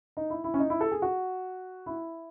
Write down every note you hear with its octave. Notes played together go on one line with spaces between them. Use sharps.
D#4
E4
E4
C#4
D#4
E4
A4
G#4
F#4
E4